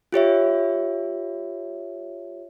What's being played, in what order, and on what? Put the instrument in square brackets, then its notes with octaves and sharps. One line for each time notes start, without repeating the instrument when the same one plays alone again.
[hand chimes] F4 G4 C#5 E5